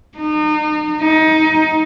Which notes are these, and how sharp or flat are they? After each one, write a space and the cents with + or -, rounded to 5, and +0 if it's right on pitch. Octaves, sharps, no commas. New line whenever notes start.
D#4 -35
D#4 +20